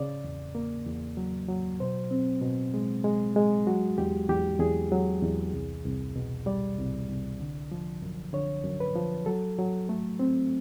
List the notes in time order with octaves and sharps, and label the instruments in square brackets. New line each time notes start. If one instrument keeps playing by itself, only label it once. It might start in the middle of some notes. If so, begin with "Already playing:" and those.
Already playing: [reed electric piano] C#3 D5
E2
A#3
E2
F#3
F#3
B2 C5
C4
B2
G#3
G#3
G#3
F#3 F#4
E2 G4
E2 G4
E2 G#4
F#3
E2
C2
C2
B2
G3 D5
C2
C2
D3
F3
F#2
D3 C#5
F#2
B4
F3
F#3 A4
F#3
A3
C4